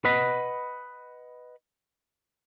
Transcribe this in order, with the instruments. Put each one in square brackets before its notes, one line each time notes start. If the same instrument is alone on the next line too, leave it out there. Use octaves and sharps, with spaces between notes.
[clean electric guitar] B4 D#5 F#5 B5